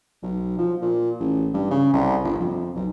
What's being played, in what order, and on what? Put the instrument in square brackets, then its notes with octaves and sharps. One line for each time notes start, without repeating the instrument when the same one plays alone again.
[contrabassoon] B1
F3
A#2
A1
G2
C#3
C2
G1
F2
B1